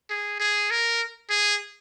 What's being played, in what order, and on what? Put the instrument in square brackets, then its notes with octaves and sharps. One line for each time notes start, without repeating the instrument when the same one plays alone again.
[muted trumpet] G#4
G#4
A#4
G#4